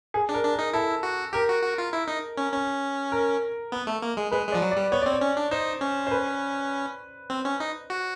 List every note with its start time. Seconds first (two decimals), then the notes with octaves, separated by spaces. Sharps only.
0.14 G#4
0.29 D4
0.34 A#4
0.44 D4
0.54 A#4
0.59 D#4
0.73 E4 A4
1.03 F#4
1.33 G4 A#4
1.49 F#4
1.63 F#4
1.78 F4
1.93 E4
2.08 D#4
2.37 C#4
2.52 C#4
3.12 A#4
3.72 B3
3.87 A3
4.02 A#3
4.17 G#3
4.32 G#3 B4
4.47 G#3 D5
4.55 F3
4.62 F#3
4.71 D5
4.77 G3
4.92 B3 C#5
5.02 C4 D5
5.12 C#5
5.21 C#4
5.37 D4
5.51 D#4 C5
5.81 C#4
6.07 C5
6.11 B4
7.30 C4
7.45 C#4
7.60 D#4
7.90 F#4